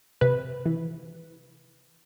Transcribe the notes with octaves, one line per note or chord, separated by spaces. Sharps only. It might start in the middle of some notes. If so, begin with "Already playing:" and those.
C3 B4
E3